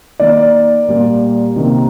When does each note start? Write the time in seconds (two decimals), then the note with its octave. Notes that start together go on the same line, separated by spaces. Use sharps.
0.20 D#3 A#3 D5
0.88 A#2 G3 A#3
1.56 C3 D#3 A#3